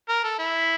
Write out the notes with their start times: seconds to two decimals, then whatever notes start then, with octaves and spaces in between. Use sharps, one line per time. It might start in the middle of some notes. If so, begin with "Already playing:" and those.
0.09 A#4
0.24 A4
0.39 E4